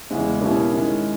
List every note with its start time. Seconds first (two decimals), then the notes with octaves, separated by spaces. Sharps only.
0.10 E2 C#3 G#3 C#4 E4
0.41 B2 A#3 C#4 E4 G4
0.72 D#3 G#3 C#4 E4